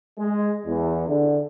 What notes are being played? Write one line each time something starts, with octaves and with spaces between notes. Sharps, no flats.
G#3
E2
D3